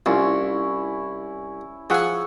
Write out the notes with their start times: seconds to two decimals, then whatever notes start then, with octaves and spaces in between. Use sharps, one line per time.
0.06 C2 C#4 E4 F4 C#6
1.90 F3 G#4 F#5 G#5 C#6 E6